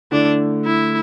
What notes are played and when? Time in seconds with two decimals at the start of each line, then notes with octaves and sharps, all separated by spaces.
0.12 D3 A3 D4 E4
0.65 E4